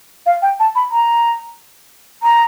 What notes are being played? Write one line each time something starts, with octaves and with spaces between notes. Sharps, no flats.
F5
G5
A5
B5
A#5
A#5